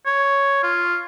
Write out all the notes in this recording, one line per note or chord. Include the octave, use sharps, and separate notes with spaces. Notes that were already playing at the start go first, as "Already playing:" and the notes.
C#5
F4